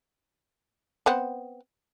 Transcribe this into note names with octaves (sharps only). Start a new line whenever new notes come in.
B3 C4 F#5